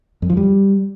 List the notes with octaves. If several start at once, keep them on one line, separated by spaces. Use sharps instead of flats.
F2
F3
G3